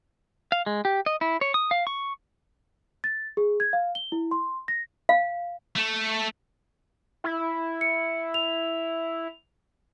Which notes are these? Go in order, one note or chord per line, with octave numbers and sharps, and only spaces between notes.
F5
G#3
G4
D#5
E4
C#5
D#6
F5
C#6
A6
G#4
G#6
F5
G7
E4
C6
A#6
F5
A3
E4
C#7
F7